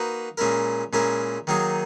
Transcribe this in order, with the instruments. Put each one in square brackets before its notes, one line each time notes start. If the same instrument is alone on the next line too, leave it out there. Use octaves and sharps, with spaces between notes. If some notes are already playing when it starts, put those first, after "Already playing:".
Already playing: [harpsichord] A#3 D#4 F#4 B4
A#2 G#3 C#4 E4 A#4
A#2 G#3 C#4 E4 A#4
D#3 F#3 A#3 D#4 G#4